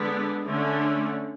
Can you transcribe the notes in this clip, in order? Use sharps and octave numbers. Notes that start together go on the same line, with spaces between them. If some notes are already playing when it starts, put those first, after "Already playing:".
Already playing: D3 G#3 B3 D4
D3 A3 C#4